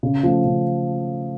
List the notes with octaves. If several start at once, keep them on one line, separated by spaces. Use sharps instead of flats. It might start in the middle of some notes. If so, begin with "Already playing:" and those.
C#3
F3 A3
C#3